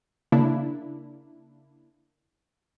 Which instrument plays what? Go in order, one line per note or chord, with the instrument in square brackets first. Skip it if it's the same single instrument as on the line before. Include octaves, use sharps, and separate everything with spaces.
[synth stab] C#3 A#3 D4 E4